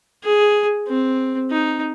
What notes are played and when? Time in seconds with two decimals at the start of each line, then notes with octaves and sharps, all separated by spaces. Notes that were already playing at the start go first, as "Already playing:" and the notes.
0.23 G#4
0.88 C4
1.51 D#4